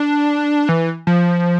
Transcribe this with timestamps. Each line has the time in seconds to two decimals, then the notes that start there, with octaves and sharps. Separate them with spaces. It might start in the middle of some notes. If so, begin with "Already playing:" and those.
Already playing: D4
0.69 E3
1.07 F3